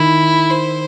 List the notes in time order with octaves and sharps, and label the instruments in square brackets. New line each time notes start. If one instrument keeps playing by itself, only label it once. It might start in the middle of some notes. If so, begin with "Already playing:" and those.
Already playing: [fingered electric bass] D#3 [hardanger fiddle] E4
[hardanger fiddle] C5